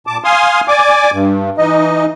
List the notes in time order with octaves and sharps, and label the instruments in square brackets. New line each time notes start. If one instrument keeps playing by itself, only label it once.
[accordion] A#2 A5 D6
F5 G#5 C6 D#6 F6
D5 G#5 D6
G2
E3 D#4 D#5